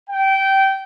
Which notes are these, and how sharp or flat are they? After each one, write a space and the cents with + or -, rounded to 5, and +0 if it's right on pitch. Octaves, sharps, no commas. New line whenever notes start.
G5 -20